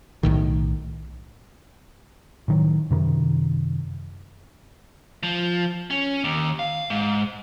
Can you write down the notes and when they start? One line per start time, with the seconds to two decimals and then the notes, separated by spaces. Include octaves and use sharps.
0.23 B1 A2 D#3
2.48 A2 D#3 F#3
2.91 F#2 C3 D#3
5.23 F3
5.90 C#4
6.24 D#2
6.59 F5
6.90 G#2